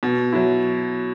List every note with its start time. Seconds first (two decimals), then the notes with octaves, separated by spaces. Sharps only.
0.03 B2
0.33 F#3 E4